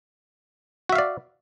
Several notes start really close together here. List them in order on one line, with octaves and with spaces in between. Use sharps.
F#4 E5 F5 D5